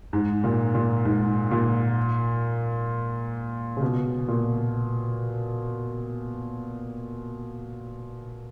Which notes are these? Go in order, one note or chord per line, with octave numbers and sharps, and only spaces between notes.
G#2
A#2
A#2
G#2
A#2
C#3
B2
A#2